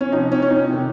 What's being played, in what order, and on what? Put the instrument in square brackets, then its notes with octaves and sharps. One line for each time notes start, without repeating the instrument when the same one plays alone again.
[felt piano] C#4
C3 F3 D#4
C#4
C#4
D#4
C3 D#3